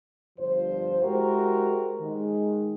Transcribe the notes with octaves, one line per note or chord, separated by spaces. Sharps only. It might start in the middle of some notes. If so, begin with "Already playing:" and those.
G1 G2 F3 C5
G#3 E4 F#4 G4 A#4 C5
D#3 G#3